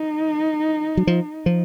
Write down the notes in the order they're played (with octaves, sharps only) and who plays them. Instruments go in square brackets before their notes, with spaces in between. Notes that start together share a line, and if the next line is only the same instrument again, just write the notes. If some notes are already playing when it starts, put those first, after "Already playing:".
Already playing: [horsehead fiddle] D#4
[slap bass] F#3
F3
F3